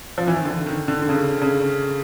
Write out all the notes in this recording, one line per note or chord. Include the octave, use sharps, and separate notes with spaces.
F3
E3
D#3
D3
D#3
D3
D3
C#3
C#3